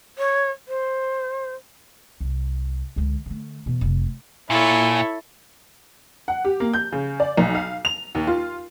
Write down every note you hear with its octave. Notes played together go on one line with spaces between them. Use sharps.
C#5
C5
C2
C#2 D3
D3 A3
E2 B2
F1 C3
A#2 E4 A4 C#5
F#5
G4
A#3
G6
C#3
D5
B1
F5
F7
D#2
F4